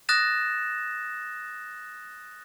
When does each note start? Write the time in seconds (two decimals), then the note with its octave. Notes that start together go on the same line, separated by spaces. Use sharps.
0.09 D#6 F#6 A6 A#6 E7